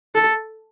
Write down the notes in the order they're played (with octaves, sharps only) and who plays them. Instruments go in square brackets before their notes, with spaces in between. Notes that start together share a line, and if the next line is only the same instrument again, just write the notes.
[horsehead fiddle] A4